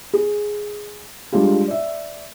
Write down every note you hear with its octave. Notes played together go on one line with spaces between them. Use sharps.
G#4
G3 G#3 D4 F4 G4
D5 E5